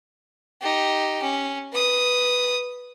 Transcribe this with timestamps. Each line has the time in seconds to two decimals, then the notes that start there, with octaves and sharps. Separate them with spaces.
0.61 D#4 G4
1.23 C#4
1.73 B4 D#6